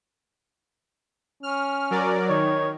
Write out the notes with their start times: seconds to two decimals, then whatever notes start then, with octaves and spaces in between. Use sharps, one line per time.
1.43 C#4 F6
1.91 F#3 A#4 D5
2.29 D#3 C#5